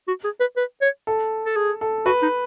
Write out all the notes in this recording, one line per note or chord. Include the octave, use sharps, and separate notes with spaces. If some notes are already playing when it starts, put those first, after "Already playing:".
F#4
G#4
B4
B4
C#5
A4
A4
G#4
A4
F#4 B4
D#4